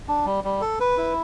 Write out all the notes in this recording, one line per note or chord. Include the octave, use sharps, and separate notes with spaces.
D4
G3
G3
A4
B4
E4